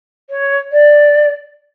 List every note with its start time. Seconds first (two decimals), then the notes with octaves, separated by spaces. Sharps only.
0.30 C#5
0.72 D5